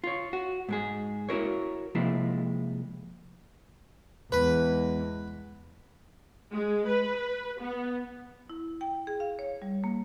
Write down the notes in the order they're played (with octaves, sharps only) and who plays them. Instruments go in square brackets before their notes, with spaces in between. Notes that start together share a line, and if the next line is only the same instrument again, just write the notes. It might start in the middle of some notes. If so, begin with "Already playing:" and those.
[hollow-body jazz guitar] F4 C#5
F#4
G#2 G#3 G#4
E4 F#4 A#4 C#5
C3 F3 G#3 A#3 E4
[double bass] E2 G#3 [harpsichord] B4
[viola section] G#3
B4
B3
[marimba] E4
G5
G#4
F5
C#5
G3
A#3